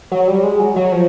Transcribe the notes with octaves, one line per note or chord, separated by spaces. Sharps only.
F#3
G3
G#3
F#3
F#3
F3